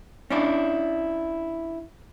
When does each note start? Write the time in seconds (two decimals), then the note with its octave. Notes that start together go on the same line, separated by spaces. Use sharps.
0.30 C#4 D4 E4